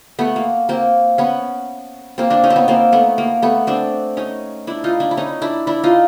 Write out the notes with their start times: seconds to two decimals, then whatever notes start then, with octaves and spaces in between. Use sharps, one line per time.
0.19 A3 B3
0.36 A#3
0.69 A#3 C4
1.18 B3 C#4
2.18 A#3 C4
2.30 C4 D4
2.44 C#4 D#4
2.50 C4
2.56 B3 C#4
2.68 A#3 C4
2.92 A3 B3
3.18 A#3
3.42 A3 B3
3.67 C4 D4
4.17 C#4 D#4
4.67 D4 E4
4.84 D#4 F4
5.00 D4 E4
5.11 E4
5.17 C#4 D#4
5.42 D4 E4
5.67 D4 E4
5.84 D#4 F4